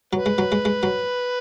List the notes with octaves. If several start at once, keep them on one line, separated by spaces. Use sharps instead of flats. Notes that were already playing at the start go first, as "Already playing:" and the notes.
F#3 B4
G#3
F#3
G#3
G#3
F#3